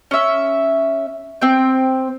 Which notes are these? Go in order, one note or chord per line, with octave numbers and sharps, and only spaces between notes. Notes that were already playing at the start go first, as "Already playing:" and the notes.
C#4 E5
C4 G5